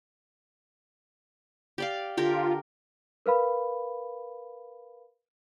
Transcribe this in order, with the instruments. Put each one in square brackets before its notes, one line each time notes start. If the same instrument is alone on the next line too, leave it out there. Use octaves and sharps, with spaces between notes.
[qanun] G4 D5 F5
[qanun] D3 G4 A#4 [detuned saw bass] F4
[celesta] A#4 B4 F5 B5